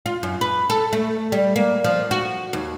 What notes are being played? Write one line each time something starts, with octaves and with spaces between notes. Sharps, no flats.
F4
F#2
B4
A4
A3
G3
A#3
F3
F#4
D#2